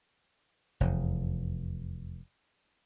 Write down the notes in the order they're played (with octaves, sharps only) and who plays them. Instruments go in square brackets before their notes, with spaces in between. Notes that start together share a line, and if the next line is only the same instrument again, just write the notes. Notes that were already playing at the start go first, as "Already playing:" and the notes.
[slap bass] F1 E2